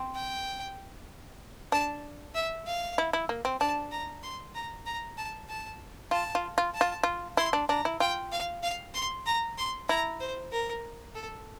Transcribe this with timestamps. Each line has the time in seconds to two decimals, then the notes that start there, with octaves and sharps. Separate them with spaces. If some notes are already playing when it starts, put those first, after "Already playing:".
Already playing: C4
0.15 G5
1.72 D4 A5
2.35 E5
2.66 F5
2.98 E4
3.13 E4
3.29 A#3
3.45 C4
3.60 D4 A5
3.91 A#5
4.23 C6
4.55 A#5
4.86 A#5
5.17 A5
5.49 A5
6.11 F4 A5
6.35 F4
6.58 F4
6.75 A5
6.81 F4
7.03 F4
7.37 E4 C6
7.53 D4
7.69 D4 A#5
7.85 E4
8.00 F4 G5
8.32 F5
8.63 F5
8.94 C6
9.26 A#5
9.58 C6
9.89 E4 A#5
10.20 C5
10.52 A#4
11.15 A4